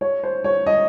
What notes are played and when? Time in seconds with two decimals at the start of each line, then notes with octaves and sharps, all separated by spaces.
0.01 C#5
0.23 C5
0.44 C#5
0.66 D#5